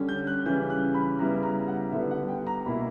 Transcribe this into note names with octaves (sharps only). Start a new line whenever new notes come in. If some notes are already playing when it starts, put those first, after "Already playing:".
Already playing: D3 G3 C#4
G6
F#6
C#3 E3 G3 C#4 G6
F#6
B5
C#3 G3 B3 E4 A#5
A#5
F#5
D3 G3 B3 D4 E5
F#5
G5
A#5
B2 A#3 E4 B5